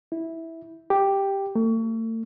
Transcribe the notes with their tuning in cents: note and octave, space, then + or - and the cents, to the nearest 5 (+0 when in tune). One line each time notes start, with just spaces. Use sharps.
E4 -10
G4 +0
A3 +40